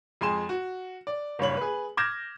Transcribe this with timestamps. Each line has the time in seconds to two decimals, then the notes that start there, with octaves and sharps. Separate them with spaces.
0.21 F2 G#3 G#5 C6 E7
0.49 F#4
1.07 D5
1.39 F#1 G2 C#5 F#7
1.57 G#4 B4
1.97 D6 F6 G6 G#6 A#6 E7